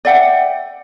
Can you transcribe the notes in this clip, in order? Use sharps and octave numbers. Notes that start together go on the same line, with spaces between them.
D5 E5 F#5 G5